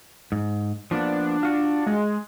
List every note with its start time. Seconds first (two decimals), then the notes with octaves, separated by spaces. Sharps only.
0.32 G#2
0.91 F3 A#3 B3 D4
1.43 F4 F#4
1.87 G#3